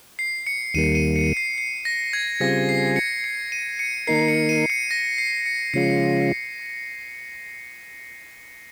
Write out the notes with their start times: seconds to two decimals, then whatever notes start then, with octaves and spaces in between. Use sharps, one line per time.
0.19 C7
0.47 C#7
0.74 D#2 D#3 G3 A#3 D#7
0.95 D#7
1.16 C#7
1.37 C7
1.58 C7
1.85 A#6
2.13 G#6
2.40 C#3 G3 C4 F4 G#4 A#6
2.69 C7
2.96 C#7
3.24 C#7
3.52 D#7
3.79 C#7
4.07 D#3 A#3 D#4 A#4 C7
4.28 C#7
4.49 D#7
4.70 C#7
4.91 A#6
5.18 C7
5.46 C#7
5.74 C#3 F3 G#3 C#4 F4 C7